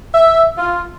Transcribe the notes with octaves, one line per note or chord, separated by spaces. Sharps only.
E5
F4